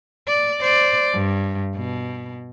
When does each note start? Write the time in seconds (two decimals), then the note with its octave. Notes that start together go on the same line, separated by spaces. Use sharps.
0.27 D5
0.61 C5 D5
1.13 G2
1.76 B2